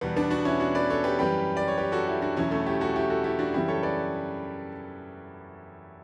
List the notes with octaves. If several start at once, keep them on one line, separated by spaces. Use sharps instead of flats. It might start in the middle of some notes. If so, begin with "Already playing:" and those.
E2 B2 G3 B3
B3 D4
D4 F#4
C#4 E4
D4 F#4
B4 D5
A4 C#5
G4 B4
F#2 E3 G3 G4 B4
D5
C#5
G4 B4
F#4 A4
E4 G4
D4 F#4
E2 B2 F#3 C#4 E4
A3 C#4
E4 G4
F#4 A4
E4 G4
F#4 A4
E4 G4
D4 F#4
F#2 C#3 E3 G3 E4 G4
A4 C#5
B4 D5